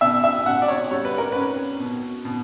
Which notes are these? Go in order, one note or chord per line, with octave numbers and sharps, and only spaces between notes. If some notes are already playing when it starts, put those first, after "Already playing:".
B2 E5
E5
B2 F#5
D5
C#5
G3 C#5
B4
A#4
C#4 B4
B2
B2